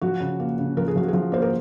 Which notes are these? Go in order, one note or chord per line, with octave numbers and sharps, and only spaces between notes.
F3 F#4
C#3
A#3
C#3
F3 A#4
G#4
F3 F#4
F3 G#4
A#3 C5
A#4